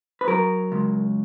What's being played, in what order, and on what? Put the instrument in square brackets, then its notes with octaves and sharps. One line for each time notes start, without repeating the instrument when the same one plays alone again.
[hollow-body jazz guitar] B4
F#3 A#4
C#2